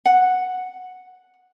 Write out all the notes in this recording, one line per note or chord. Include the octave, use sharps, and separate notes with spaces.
F#5